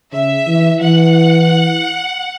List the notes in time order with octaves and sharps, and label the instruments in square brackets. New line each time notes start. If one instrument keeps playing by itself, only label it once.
[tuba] C#3 [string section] E5
[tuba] E3
[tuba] E3 [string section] F#5